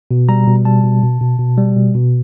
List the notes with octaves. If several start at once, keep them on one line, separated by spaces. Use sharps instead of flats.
B2
G3 A#5
B2
G3 A5
B2
B2
B2
B2
G3
B2
B2